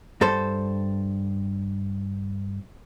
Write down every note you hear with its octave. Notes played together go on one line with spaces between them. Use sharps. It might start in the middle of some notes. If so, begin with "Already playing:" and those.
G2 A4 C5